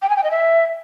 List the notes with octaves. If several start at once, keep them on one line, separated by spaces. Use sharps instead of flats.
G5
G#5
G5
D#5
E5